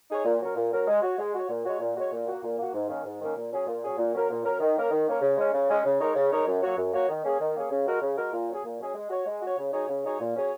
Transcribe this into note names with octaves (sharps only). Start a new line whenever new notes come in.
D#4 G#4 C#5
A#2
F#3 C#4 A#4
A#2
F#3 C#4 A#4
G#3
F#4 C#5
G#3
F#4 C#5
A#2
G#3 F#4 C#5
A#2
G#3 F#4 C#5
A#2
A#3 F#4
A#2
A#3 F#4
G#2
D#3 A#3 C#4
G#2
D#3 A#3 C#4
A#2
F#3 C#4 G#4
A#2
F#3 C#4 G#4
A#2
F#3 C#4 A#4
A#2
F#3 C#4 A#4
D#3
A#3 C#4 A#4
D#3
A#3 C#4 A#4
C#3
G#3 C#4
C#3
G#3 C#4
C#3
G#3 D#4 A#4 C#5
C#3
G#3 D#4 A#4 C#5
F#2
F#3 A#3 F#4 C#5
F#2
F#3 A#3 F#4 C#5
D#3
A#3 C#4 G#4
D#3
A#3 C#4 G#4
C#3
G#3 F#4 A#4
C#3
G#3 F#4 A#4
A#2
F#3 C#4 G#4
A#2
F#3 C#4 G#4
G#3
F#4 C#5
G#3
F#4 C#5
C#3
F#3 D#4 G#4 C#5
C#3
F#3 D#4 G#4 C#5
A#2
F#3 C#4 G#4 C#5